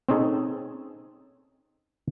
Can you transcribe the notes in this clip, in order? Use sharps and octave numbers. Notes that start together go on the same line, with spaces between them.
C4 C#4 D#4 G#4 A4